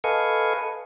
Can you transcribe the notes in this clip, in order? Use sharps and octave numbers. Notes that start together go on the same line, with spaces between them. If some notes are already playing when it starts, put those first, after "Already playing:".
A4 B4 D#5 F5 G#5 C#6